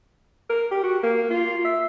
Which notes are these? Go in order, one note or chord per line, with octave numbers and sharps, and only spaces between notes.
A#4
G4
F#4
A#3
F4
E5